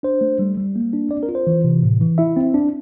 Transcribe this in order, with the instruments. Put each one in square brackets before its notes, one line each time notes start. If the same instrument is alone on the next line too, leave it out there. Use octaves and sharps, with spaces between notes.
[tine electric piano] D4 C5
A3
G3
G3
A#3
D4
C4 D5
A#4
F4
C5
E3
C3
A2
E3
E4 E5
C4
D4